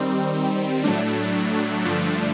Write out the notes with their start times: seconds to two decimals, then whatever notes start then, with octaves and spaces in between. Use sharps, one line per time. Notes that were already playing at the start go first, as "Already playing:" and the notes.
Already playing: D#3 G3 C4
0.84 A2 F#3 A3 D4
1.85 G2 D3 F3 A3 D4